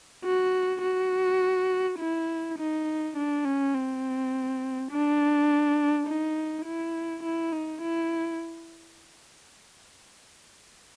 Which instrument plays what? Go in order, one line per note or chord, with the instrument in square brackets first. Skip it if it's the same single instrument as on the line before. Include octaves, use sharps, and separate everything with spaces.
[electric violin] F#4
F#4
E4
D#4
D4
C#4
C4
D4
D#4
E4
E4
D#4
E4